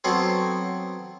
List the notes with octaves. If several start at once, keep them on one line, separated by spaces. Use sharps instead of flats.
F#3 B3 C4 A4 C5